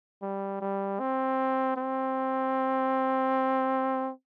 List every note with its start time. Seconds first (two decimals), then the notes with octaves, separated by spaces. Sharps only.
0.22 G3
0.61 G3
1.00 C4
1.76 C4